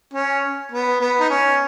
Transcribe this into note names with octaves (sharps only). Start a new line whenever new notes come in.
C#4
B3
B3
D#4
C#4